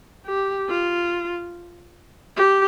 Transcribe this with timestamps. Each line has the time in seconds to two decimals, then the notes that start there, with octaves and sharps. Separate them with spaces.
0.26 G4
0.70 F4
2.37 G4